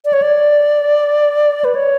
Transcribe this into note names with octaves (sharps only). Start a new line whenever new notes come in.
D5
C#5
D5
B4
C#5